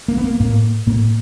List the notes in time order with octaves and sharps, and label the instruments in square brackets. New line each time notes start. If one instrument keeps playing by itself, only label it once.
[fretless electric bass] A#3
B3
A#3
A2 A#3
A2 A#3